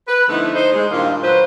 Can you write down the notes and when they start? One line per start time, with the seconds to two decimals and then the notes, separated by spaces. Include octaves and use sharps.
0.08 B4
0.29 D3 F3 A3 B3 D#4 E4
0.55 D#4 C5
0.73 G#3
0.91 G2 A#2 D#3 A#3 E4 F4
1.23 F#3 B4 C5